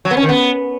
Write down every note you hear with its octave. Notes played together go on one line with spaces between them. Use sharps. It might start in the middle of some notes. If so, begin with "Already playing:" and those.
F#3
B3
C#4
D#3
B3